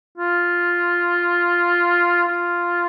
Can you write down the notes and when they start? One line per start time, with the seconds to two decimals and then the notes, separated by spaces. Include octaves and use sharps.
0.18 F4
2.28 F4